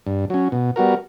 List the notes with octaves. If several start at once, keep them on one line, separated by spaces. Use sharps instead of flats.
G2
F#3 C#4
B2
G3 B3 F#4 A#4